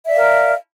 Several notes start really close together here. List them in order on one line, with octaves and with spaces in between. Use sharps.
E5 D5 F5 A#4